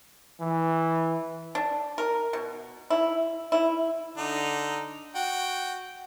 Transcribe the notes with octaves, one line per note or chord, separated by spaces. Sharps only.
E3
D4
A#4
B2
E4
E4
D3 D#4
F#4 G5